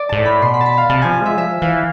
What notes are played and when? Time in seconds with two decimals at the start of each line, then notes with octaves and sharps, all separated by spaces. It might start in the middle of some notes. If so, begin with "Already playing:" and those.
Already playing: D5
0.09 G#2 A5
0.18 A2
0.25 B5
0.42 B2 C6
0.54 B5
0.61 A5
0.66 B5
0.78 F5
0.90 C3 A5
1.02 F3 G#5
1.21 G#3 E5
1.37 F3 E5
1.62 E3 F5